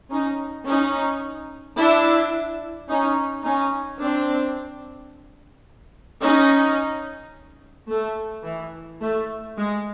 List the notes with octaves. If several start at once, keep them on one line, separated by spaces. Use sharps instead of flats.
C#4 D#4
C#4 D#4
D4 E4
C#4 D#4
C#4 D#4
C4 D4
C#4 D#4
A3
E3
A3
G#3